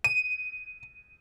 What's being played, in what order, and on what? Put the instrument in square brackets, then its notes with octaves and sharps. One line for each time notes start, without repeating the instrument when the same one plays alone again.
[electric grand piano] D#7